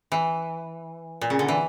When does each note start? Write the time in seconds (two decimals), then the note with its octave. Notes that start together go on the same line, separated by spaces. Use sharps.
0.12 E3
1.21 A#2
1.30 C#3
1.39 D3
1.48 E3